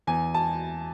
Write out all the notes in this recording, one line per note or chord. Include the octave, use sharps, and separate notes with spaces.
E2 G#5
A5